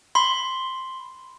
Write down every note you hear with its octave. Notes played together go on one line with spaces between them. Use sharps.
B5 C6